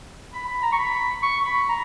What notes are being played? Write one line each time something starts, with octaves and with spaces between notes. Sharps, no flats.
B5
B5
A#5
C#6
B5
C#6
B5
A#5